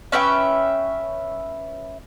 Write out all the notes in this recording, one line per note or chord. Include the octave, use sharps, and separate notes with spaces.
C#4 B4 E5 G5